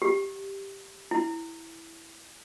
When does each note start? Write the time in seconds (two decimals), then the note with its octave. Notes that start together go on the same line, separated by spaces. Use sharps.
0.02 G4
1.11 E4